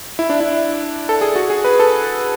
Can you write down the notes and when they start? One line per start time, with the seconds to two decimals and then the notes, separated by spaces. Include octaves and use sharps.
0.19 E4
0.30 D4
0.40 E4
1.09 A4
1.21 G#4
1.36 F#4
1.50 G#4
1.64 B4
1.80 A4